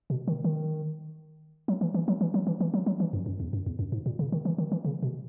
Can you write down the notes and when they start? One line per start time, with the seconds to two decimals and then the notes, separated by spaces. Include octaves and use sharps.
0.10 B2
0.28 D#3
0.44 D#3
1.68 F#3
1.81 E3
1.94 E3
2.08 F#3
2.21 E3
2.34 F#3
2.47 E3
2.61 E3
2.74 F#3
2.86 F#3
3.00 E3
3.13 F#2
3.26 F#2
3.40 E2
3.53 F#2
3.66 E2
3.79 F#2
3.92 G#2
4.06 A#2
4.19 C#3
4.32 D#3
4.45 E3
4.58 D#3
4.72 E3
4.85 C#3
5.02 B2